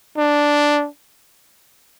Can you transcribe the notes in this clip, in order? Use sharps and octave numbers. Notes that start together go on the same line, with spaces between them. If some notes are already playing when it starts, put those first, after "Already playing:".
D4